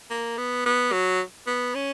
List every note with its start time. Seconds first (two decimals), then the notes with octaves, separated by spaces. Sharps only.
0.11 A#3
0.38 B3
0.66 B3
0.92 F#3
1.47 B3
1.75 C#4